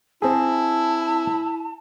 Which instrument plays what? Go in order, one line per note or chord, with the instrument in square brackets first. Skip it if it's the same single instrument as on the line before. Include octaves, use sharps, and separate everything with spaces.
[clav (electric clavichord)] C4 G#4 [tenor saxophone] E4 [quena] A5